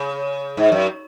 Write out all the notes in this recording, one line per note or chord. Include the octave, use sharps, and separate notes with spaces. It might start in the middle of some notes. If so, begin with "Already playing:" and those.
Already playing: C#3
G#2
F#2